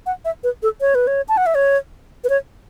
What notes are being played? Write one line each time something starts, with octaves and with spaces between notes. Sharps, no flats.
F#5
E5
B4
A4
C#5
B4
C#5
A5
F#5
E5
C#5
B4
C#5